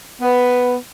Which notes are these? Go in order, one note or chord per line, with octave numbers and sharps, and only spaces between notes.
B3